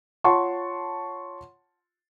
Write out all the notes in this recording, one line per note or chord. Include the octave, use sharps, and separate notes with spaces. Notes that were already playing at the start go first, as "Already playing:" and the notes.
F4 C#5 F#5 A5 C6 C#6